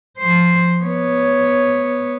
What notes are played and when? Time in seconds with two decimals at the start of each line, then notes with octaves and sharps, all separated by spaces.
0.18 F3 C5
0.83 B3 C#5